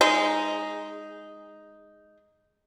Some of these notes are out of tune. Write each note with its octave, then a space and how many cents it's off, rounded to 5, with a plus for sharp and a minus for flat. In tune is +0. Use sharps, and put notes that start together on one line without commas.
G#3 -10 D#4 +0